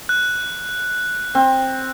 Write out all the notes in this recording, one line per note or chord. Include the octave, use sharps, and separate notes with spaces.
F#6
C4